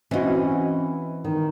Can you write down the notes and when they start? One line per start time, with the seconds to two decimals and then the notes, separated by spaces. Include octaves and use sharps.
0.11 E3 C4 C#4 F#4 D#5
1.24 D#3